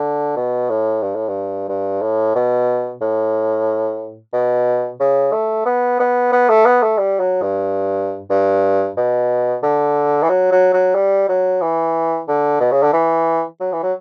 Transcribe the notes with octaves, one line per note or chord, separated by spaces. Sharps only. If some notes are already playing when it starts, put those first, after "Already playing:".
Already playing: D3
B2
A2
G2
A2
G2
G2
A2
B2
A2
B2
C#3
A3
B3
B3
B3
A3
B3
A3
G3
F#3
G2
G2
B2
D3
E3
F#3
F#3
F#3
G3
F#3
E3
D3
B2
C#3
D3
E3
F#3
E3
F#3